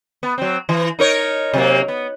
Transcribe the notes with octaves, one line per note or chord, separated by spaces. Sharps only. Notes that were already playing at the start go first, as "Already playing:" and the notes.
B3
F#3 C4
E3
D#4 A#4 C#5
C3 F#3 A#3
B3